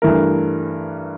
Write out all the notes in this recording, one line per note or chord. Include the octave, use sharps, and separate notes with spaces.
G2 E3 A3 E4 A#4